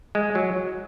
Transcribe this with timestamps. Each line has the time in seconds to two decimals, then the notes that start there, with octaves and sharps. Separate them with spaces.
0.15 G#3
0.35 F#3